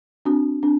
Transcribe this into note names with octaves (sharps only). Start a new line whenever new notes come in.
C4 D4 F#4
C4 D4